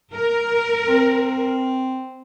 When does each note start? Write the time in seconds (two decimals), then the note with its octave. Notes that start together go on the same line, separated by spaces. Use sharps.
0.13 A#4
0.88 C4